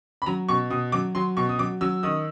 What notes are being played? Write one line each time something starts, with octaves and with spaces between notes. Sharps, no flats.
B5
F#3 A#5
B2 C#6
B2 D#6
F#3 D6
F#3 C6
B2 C#6
D#6
F#3 D6
F#3 E6
D#3 D#6